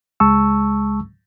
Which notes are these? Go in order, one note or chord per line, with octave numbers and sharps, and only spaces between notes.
C#2 G#3 A5 C#6 E6